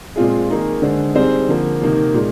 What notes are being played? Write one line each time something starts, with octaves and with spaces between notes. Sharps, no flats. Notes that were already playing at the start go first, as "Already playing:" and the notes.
A#2 G#3 C4 F4 G#4
D#3 A#3 D#4 G#4
D3 G#3 D4 G#4 C5
G3 C4 D#4 G#4 C5
D3 F3 A#3
C3 D#3 A#3 D#4
A#2 G#3